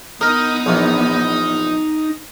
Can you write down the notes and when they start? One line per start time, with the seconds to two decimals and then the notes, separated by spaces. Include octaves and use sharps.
0.21 B3 D#4 A#4 D#5
0.66 A#1 E2